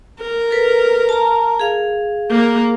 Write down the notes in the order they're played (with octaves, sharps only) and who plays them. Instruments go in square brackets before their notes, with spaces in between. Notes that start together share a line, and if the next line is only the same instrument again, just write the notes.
[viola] A#4
[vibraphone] A4 B4
A5 A#5
G#4 F5
[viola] A#3 A#4